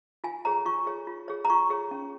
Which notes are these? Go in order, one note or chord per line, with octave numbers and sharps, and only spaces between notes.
F4 G#5
G#4 C#5 A#5
F4 C#6
G#4 C#5
F4
G#4 C#5
A#5
F4 C#6
G#4 C#5
C#4